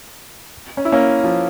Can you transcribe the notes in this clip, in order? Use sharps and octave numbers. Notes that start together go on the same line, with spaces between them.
C#4
E4
A#3 C#4
F3